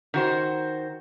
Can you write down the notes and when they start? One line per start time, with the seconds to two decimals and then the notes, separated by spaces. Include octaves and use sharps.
0.14 D#3 F#4 C5